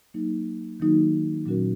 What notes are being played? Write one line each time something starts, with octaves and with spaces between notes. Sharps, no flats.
F#3 A#3 D#4
D#3 F#3 A#3 D#4 F#4
A#2 F#3 C#4 F#4 A#4